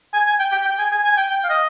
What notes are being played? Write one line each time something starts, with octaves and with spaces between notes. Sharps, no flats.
G#5
G#5
G5
G5
G5
G#5
G#5
G#5
G5
G5
F5
D#5